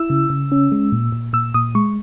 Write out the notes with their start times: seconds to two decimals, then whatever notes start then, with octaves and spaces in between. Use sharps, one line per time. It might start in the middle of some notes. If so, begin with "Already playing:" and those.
Already playing: E4 E6
0.10 C#3
0.30 C#3
0.52 C#4
0.72 G#3
0.92 A#2
1.12 A#2
1.33 A#2 E6
1.54 A#2 D#6
1.75 G#3 C#6